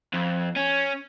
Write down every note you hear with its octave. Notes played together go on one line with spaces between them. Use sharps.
F2
C#4